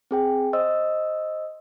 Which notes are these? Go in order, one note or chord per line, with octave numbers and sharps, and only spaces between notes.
C4 G#4 G5
C5 D#5 E6